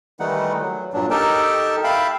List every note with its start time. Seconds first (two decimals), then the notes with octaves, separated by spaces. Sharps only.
0.20 D#3 E3 G3 A3 D#4 F#5
0.61 F#3
0.93 G2 A#2 F#3 D4
1.11 D#4 G4 A4 A#4 G5 A5
1.84 E5 F5 G5 A5 B5